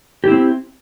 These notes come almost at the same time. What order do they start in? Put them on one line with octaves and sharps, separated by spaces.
G4 E4 C4